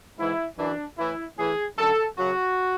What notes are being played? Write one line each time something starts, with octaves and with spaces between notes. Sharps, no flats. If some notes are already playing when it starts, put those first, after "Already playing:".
G#2 E3 E4
F#2 E3 D4
A2 E3 E4
A2 E3 G#4
F#2 D3 F#3 A4
F#2 C#3 F#3 F#4